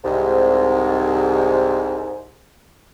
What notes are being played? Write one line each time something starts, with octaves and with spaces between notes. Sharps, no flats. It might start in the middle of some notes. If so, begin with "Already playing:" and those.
C2 G#2